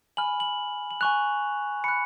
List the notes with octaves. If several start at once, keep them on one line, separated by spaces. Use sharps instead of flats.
G#5 B5 F6 F#7
F#7
F#7
G#5 C#6 F#6 F7
B5 F#6 C#7